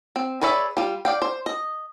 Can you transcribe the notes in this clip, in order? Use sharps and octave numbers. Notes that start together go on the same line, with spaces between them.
C4
G#4 B4 C#5 D5 E5
G3 F4
D5 F5 G5
C5
D#5